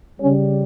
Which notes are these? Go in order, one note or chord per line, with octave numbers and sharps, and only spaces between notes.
C#3 G3 C#4